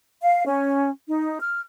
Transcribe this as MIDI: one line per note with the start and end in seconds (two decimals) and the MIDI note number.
0.21 0.44 77
0.45 0.89 61
1.07 1.37 63
1.41 1.59 89